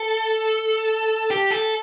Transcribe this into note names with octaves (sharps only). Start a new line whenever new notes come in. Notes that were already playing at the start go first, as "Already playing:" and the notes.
Already playing: A4
G4
A4